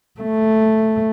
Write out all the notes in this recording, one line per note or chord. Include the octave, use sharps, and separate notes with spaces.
A3